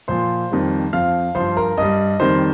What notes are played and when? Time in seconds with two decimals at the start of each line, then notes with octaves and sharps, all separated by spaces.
0.08 A#2 F3 C5 C6
0.51 F2 D#3 G3
0.93 F2 F3 F5 F6
1.35 G2 F3 C5 C6
1.57 A#4 A#5
1.77 G2 G3 D#5 D#6
2.20 F2 D#3 G3 C5 C6